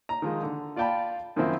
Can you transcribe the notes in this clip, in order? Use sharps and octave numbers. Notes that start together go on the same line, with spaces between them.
A#5
D#3 F3 G#3
D3
F4 D5 F5 G5 A5 B5
F#2 D#3 F3 C4 E4